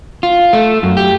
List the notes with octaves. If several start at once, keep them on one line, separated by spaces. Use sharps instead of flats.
F4
A3
F#2
G4